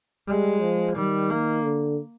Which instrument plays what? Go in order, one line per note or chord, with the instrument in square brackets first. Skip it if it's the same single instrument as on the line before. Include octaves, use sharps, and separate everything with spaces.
[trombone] G3 [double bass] G#3
[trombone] F3
[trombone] D#3 [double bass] G3
[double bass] A#3
[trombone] D3